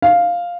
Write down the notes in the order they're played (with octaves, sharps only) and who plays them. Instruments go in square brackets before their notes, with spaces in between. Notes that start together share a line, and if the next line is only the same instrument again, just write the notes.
[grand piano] F5